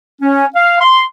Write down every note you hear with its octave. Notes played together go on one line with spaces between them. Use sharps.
C#4
F5
C6